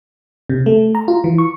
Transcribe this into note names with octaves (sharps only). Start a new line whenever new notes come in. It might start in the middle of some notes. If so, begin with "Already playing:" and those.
C3
A3
A#5
F4
E3
C#6